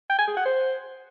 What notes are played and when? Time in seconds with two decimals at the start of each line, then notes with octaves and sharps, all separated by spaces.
0.10 G5
0.19 G#5
0.28 G#4
0.37 F#5
0.46 C5